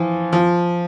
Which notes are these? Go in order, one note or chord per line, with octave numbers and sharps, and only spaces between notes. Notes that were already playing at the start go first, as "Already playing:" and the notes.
Already playing: E3 F3
F3